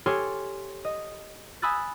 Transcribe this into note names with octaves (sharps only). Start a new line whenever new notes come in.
G4 A4 C#5 G#5 C6 F6
D#5
G#5 B5 D#6 E6 F#6 A6